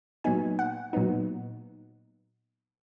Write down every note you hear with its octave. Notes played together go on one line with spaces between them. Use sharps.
A#2 F#3 B3 D#4 G#5
F#5
A#2 F#3 B3 D#4